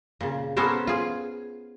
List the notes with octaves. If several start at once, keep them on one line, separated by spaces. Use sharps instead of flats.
A#2 C#3
B3 C#4 A4 A#4 C5
F4 G#4